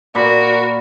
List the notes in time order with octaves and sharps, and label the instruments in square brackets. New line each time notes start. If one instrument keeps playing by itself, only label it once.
[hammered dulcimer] A#2 D5 B5 [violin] F#4 A#4